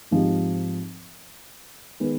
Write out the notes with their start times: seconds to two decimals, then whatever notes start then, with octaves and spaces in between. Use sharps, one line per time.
0.11 G#2 F3 C4 D#4 G4
2.00 D#3 G#3 B3 D#4 B4